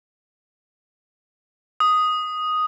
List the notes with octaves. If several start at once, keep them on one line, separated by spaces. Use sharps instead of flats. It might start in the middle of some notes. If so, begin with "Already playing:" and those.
D#6